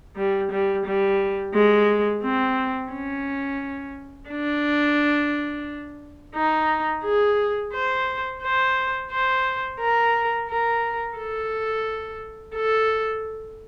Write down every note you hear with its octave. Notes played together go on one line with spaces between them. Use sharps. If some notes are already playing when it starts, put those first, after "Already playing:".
G3
G3
G3
G#3
C4
C#4
D4
D#4
G#4
C5
C5
C5
A#4
A#4
A4
A4